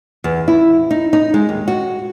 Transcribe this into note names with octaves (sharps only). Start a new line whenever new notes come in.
E2
E4
D#4
D#4
G#3
D#2
F#4